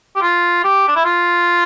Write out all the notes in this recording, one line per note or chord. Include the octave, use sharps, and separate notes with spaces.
G4
F4
G4
D4
E4
F4